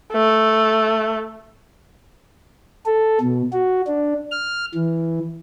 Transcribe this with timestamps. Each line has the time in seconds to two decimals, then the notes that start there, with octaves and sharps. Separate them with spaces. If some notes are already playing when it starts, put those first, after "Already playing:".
0.13 A3
2.86 A4
3.21 B2
3.53 F#4
3.87 D4
4.31 F6
4.75 E3